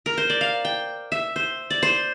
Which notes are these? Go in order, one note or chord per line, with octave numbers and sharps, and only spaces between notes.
A#4
C5
D5
F5
G5
E5
C5
D5
C5